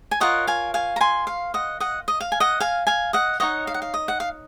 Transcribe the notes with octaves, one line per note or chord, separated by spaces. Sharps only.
G#5
F4 A#4 C#5 D#5 F#5
F5 G#5
F5 G#5
A#5
G#5 C6
F5
D#5 F#5
D#5 F#5
D#5
F5
G#5
D#5 F#5
F5 G#5
F5 G#5
D#5 F#5
D#4 F#4 C#5 D#5 F#5
F5
F#5
F5
D#5
F#5
F5